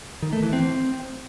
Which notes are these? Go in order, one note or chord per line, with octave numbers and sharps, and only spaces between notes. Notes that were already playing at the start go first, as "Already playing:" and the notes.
D#3
A3
E3
C4